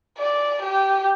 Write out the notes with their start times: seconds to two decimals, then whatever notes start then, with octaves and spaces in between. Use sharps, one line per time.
0.19 D5
0.63 G4